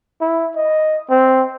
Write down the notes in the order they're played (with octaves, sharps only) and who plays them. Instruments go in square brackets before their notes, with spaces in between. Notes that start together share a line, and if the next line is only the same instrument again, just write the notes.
[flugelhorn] E4
D#5
C4